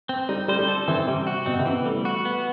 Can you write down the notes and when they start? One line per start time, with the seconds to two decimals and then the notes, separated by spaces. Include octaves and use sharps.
0.09 C4
0.29 G3 D#4
0.48 G3 C5
0.59 G3
0.68 A4
0.88 E3 C4
1.07 C3 G3
1.27 F#4
1.46 B2 C4
1.59 C3
1.65 E3
1.73 B3
1.85 G3 A3
2.05 F#4
2.25 B3